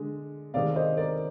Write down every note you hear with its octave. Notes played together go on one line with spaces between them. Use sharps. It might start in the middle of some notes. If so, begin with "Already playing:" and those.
Already playing: D3 G#3
C3 D#3 G#3 D5 F5
C5 D#5
A#4 D5